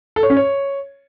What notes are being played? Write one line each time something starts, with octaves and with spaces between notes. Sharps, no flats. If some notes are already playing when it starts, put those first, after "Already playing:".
A4
C#5
C#4
C#5